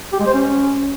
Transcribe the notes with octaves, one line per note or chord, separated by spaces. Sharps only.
G4
G#3
C5
C#4